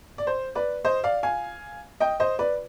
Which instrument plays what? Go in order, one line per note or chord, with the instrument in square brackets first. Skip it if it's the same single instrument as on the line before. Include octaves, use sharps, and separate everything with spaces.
[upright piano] D5
C5
B4 D5
C5 D#5
D5 F5
F5 G#5
D#5 G5
C5 D#5
B4 D5